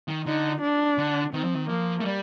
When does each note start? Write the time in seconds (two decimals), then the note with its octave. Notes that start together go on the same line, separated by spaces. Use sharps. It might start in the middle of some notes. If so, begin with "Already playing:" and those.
0.08 D#3
0.26 D3 D#4
0.62 D4
0.98 D3
1.33 D#3 C4
1.44 F3
1.54 D#3
1.69 F3 A#3
2.00 A3
2.05 G3